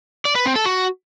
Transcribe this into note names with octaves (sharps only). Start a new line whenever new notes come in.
D5
B4
C4
A4
F#4